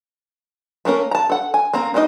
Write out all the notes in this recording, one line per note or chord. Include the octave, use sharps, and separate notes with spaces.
A3 A#3 C#4 A#4
A5 A#5
A4 F#5
G#5
A#3 C4 A#5
G3 A#3 D4 D#4 D#5